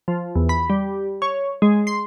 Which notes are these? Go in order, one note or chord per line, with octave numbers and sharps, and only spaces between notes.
F3
E2
B5
G3
C#5
G#3
C6